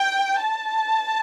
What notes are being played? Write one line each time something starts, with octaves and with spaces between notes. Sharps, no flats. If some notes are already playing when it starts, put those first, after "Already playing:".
Already playing: G5
A5